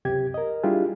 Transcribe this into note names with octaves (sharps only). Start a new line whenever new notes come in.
C#2 F#2 C3 G4 G#6
A#4 D#5
G3 D4 E4 F4 G4 G#4